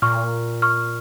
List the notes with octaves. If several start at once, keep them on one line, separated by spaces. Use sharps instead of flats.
A#2 C#6 F6
C#6 F6